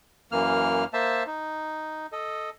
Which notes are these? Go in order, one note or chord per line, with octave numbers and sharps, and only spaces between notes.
F#2 E3 A#3 F6
A#3 C5 E5 A5
D#4
A4 D#5